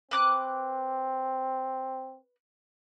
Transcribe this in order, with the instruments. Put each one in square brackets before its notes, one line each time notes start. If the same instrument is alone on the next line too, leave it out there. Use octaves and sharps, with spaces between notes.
[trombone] C4 [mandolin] B4 D6 F#6